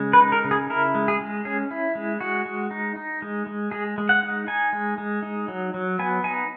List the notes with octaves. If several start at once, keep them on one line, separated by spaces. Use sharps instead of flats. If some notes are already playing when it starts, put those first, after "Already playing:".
Already playing: C#3 G#3
B4
D#4
A#4
C#3
G#4
E4 A#4
G#3
G#4
G#3
C#4 G#4
E4
G#3
G#3 F#4
G#3
D#4
D#4
G#3
G#3
G#3 G#4
G#3
F#5
D#4
D#4 G#5
G#3
G#3
D#4
F#3
F#3
B3 G#5
D#4 G#5